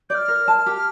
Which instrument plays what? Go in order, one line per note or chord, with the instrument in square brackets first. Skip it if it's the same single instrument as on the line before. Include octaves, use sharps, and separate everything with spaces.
[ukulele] D5 [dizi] F6 G6
[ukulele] A#4
A5
G4